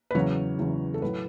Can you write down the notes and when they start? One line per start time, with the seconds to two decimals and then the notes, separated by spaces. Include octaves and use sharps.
0.11 B4
0.14 E2 C#3 F#3 C#5
0.59 E2 C#3 F#3
0.94 A4
1.02 A2 F#3 B4